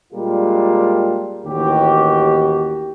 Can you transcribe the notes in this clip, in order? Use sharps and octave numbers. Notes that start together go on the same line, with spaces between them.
A#2 G3 G#3 D4 F4 A#4
A1 D#2 D#3 F#4 G4